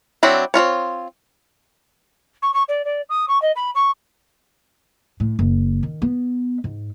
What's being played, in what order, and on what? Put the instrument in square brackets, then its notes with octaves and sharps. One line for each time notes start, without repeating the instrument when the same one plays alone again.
[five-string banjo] F#3 C4 D4 E4
C4 D#4 F4 C#5
[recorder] C#6
C#6
D5
D5
D#6
C#6
D#5
B5
C#6
[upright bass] A2
F#1
D#3
B3
G#2